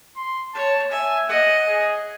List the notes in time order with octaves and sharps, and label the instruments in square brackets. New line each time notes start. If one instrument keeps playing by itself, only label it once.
[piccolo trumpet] C6
[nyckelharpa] C#5 [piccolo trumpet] A5
[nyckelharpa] E5 [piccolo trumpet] G#5
[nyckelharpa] D#5 [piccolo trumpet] F#5
[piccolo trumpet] G#4